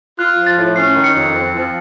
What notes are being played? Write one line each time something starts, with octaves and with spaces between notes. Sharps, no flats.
F4 F#6
F3
A6
A2
C#4 C7
D#3
C#7
F2
C4
F3